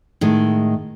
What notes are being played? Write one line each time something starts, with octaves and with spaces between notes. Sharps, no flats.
A2 D#3 G#3